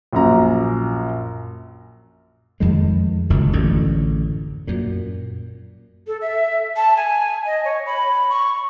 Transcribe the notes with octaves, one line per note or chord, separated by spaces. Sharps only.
A#1 F#2 A#5
F2 D#3 G#3
F#1 C#2 F#2 D#3
A1 F#2 D3
F#2 A#2
A4
E5
A5
G#5
D#5
C#5
B5
C#6